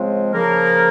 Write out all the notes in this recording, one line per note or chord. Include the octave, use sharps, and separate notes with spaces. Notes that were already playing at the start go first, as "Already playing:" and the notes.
Already playing: C#3 F3 G#3 C4
C#3 F3 A#3 A#4